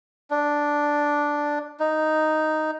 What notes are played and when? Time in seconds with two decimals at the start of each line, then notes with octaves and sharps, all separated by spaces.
0.30 D4
1.80 D#4